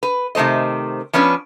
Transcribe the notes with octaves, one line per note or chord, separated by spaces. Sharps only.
B4
C3 D#3 A3 C5 D#5
F3 B3 C#4 D4 B4